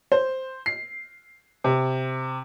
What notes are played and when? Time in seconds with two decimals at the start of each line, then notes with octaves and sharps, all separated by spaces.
0.12 C5
0.66 C7
1.64 C3